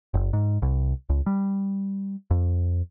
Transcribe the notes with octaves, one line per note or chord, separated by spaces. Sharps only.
F#1
G#2
C2
C#2
G3
F2